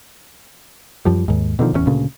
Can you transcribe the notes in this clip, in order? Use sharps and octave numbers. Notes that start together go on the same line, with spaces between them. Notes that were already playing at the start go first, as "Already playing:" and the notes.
F#2 F3 G3
D#2 G#2
B2 D3 D#3 F3
D1 E2 F#3 C#4
D2 A#2 C#3